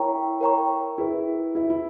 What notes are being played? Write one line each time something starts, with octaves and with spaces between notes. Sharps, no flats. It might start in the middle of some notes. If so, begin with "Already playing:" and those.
Already playing: E4 A#4 C#5 G5 A#5 C#6
A#4 C#5 G5 A#5 C#6
E4 G#4 B4 E5
E4 G#4 B4 E5
E4